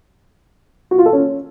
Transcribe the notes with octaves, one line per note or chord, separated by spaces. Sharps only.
F#4
F4
A4
C#4